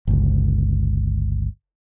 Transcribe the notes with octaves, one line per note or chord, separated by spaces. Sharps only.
G1 C#2